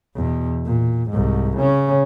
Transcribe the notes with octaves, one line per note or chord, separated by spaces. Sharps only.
E2 B2
A#2
C2 G#2
C#3 C#4